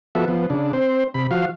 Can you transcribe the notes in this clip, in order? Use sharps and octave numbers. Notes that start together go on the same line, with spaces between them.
F3 B3 F#4 A4 E5
F3 B3
C#3 D4
C4 C5
C3 B5
F3 F#4 F5